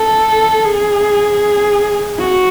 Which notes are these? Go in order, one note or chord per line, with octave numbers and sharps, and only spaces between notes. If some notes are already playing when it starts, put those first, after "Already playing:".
Already playing: A4
G#4
F#4